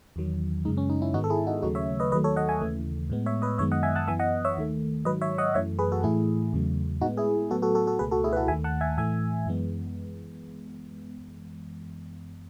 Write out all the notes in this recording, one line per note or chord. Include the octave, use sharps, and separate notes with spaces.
E2 D#3 F#3
F#2 C#3 G#3 D#4
C#4
D#4
C#4 E4
G#2 D#3 G#3 B3 D#4 F#4
A4
E4 G#4
D#4 F#4
D#2 C#3 F#3 A3 D#4 F#4
C#5 E5
B4 D#5
D#2 D#3 F#3 A3 B4 D#5
A4 C#5
D#5 F#5
E5 G#5
D#2 C#3 E3 A3
A2 G#3 B3
C#5 E5
B4 D#5
F#2 D#3 G#3 B3 C#5 E5
D#5 F#5
E5 G#5
F#5 A5
F#2 E3 B3 E5 G#5
D#5 F#5
C#5 E5
D#2 D#3 A3
G#2 D#3 F#3 B4 D#5
C#5 E5
D#5 F#5
F#2 E3 A3 C#5 E5
G#4 B4
F#4 A4
A2 E3 A3 E4 G#4
E2 C#3 F#3 A3
A2 G#3 B3 D#4 F#4
E4 G#4
A2 F#3 B3 F#4 A4
F#4 A4
F#4 A4
F#4 A4
C#2 B2 A3 G#4 B4
F#4 A4
E4 G#4
B4
F#4 A4
D#2 D#3 A3 E5 G#5
F#5 A5
E5 G#5
A2 E3 A3 E5 G#5
F#2 E3 G#3 B3